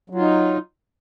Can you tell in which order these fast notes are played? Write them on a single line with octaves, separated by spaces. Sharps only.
F#3 F4 D#4